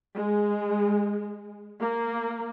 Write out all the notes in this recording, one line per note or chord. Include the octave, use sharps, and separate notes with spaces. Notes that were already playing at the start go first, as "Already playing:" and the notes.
G#3
A#3